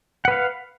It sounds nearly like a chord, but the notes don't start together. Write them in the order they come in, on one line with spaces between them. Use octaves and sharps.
F#5 B4 F5